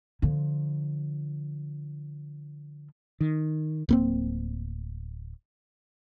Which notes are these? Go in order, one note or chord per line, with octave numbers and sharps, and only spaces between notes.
D3 F3
D#3
D1 A#3 C4